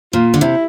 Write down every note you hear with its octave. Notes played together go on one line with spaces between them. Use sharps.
A#2 F4
D3
C3 E4